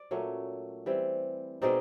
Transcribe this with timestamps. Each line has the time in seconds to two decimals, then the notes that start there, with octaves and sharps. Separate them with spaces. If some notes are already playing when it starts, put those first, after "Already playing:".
Already playing: D5
0.11 A#2 F#3 A3 C#4
0.86 E3 G3 C4
1.62 B2 G#3 C4 D#4 D5